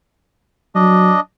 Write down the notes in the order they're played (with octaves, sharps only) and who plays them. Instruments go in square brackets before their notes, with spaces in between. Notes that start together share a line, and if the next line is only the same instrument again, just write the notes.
[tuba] F#3 [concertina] D4 D#5